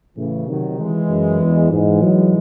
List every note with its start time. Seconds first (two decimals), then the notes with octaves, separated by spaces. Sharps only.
0.17 A2 C#3 E3
0.47 C3 D#3 F#3
0.78 E3 G#3
1.09 F#2
1.41 E2
1.71 G#2 E3 G#3
2.03 F#3